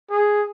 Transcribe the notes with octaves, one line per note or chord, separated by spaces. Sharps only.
G#4